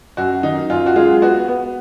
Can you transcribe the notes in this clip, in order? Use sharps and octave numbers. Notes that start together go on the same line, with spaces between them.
F#2 F#4
D#3 D#4
F#2 F4
F#4
G#3 F4
B3 F#4
B3